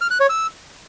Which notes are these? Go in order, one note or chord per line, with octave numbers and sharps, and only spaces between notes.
F6
F#6
C#5
E6